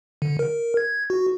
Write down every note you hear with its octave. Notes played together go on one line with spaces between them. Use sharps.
D3
A#4
G#6
F#4